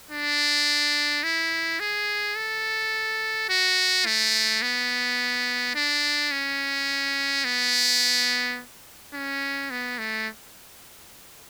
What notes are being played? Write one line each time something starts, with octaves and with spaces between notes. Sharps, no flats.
D4
E4
G#4
A4
F#4
A3
B3
D4
C#4
B3
C#4
B3
A3